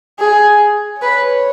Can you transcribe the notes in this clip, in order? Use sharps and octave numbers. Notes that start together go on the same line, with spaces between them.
G#4
B4 C#5